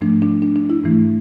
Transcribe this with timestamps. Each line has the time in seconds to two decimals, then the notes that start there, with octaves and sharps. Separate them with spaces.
0.01 G#2 F3 A3 D4
0.22 D4
0.42 D4
0.56 D4
0.70 E4
0.84 G#2 E3 A3